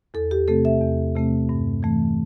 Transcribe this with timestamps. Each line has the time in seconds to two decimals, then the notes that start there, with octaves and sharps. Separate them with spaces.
0.14 E2 A4
0.31 G4
0.48 C3 A3 C4 A4
0.65 E5
0.81 E2
1.15 C3 A3 C4
1.49 G2
1.83 E3 A3